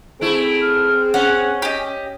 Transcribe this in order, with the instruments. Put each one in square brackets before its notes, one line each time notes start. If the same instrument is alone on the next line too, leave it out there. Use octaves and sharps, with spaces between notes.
[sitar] A3 E4 [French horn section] C4 G#4 [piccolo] D7
[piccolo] F6
[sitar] C#4 [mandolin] F#5 [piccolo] G#5
[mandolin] G4 D#5